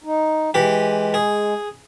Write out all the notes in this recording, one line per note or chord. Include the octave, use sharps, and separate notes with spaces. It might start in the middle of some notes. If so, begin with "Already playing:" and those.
D#4
E3 G#3 G4
G#4